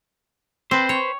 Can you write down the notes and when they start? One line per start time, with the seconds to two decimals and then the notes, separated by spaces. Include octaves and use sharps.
0.71 C4 B4 C5
0.89 C#5